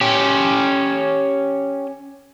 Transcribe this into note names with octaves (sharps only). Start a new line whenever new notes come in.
C#4 G4